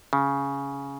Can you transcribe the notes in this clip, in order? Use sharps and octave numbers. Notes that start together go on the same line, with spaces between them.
C#3